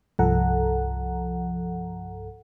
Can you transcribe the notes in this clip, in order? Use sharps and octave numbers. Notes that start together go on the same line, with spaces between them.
C2 G2 F3 A4 F#5 A#5